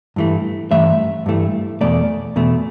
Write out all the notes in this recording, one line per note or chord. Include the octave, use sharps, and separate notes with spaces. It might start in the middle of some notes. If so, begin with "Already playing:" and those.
G2 E3 A3
G2 E3 A3 E5
G2 E3 A3
E2 B2 A3 D5
E2 B2 A3